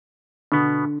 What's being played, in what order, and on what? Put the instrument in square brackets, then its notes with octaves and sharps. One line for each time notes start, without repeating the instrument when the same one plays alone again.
[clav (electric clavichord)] B2 B3 [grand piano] D3